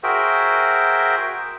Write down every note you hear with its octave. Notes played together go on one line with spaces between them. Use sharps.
F#4 G#4 A#4 C5 E5 G5